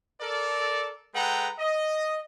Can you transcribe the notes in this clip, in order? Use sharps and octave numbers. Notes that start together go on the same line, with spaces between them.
A4 A#4 D5
G#3 A4 B4 F#5 G5 A#5
D#5